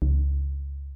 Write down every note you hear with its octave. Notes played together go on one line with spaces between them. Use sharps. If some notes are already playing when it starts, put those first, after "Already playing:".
C#2